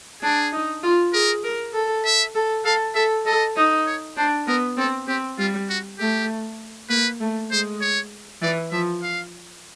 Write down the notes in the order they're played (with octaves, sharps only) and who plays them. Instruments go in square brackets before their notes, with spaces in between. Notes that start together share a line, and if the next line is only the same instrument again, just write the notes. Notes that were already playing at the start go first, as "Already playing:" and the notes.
[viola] D4 [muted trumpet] G#4
[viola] D#4
F4
[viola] G#4 [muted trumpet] A#4
[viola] A#4
A4
[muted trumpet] E5
[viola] A4
[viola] A4 [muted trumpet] F5
[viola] A4 [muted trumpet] E5
[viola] A4 [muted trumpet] D#5
[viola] D#4
[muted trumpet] C#5
[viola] D4 [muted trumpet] C5
[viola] B3 [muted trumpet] A#4
[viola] C4 [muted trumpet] A4
[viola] C4 [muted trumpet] G4
[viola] G3 [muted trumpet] F4
[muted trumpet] F#4
[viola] A3 [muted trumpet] G4
[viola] A#3 [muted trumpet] B4
[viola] A3
[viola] G#3 [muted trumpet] C5
[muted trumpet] C#5
[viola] E3 [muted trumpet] D5
[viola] F3 [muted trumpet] E5
[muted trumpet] F5